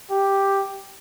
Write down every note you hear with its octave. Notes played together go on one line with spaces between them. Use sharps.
G4